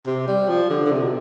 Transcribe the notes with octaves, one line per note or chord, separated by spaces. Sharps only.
C3
G3
F3
D3
D3
C3
B2